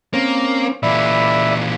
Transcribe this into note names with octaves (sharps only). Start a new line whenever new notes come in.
A#3 C4 C#4
A#2 E3 D5 E5 B5